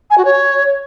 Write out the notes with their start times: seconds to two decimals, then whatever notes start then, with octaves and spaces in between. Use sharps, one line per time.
0.10 G#5
0.18 F#4
0.25 C#5